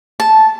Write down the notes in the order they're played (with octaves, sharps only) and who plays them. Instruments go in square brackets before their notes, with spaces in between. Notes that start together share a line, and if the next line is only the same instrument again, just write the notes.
[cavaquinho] A5